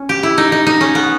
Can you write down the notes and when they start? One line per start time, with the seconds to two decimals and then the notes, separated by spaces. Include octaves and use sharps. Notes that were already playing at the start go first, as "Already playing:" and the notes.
Already playing: C#4
0.09 G4
0.23 E4
0.38 D#4
0.52 D#4
0.67 D#4
0.81 C#4
0.95 B3